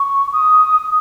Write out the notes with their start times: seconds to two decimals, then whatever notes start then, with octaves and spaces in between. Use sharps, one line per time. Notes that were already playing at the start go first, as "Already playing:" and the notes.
Already playing: C#6
0.33 D#6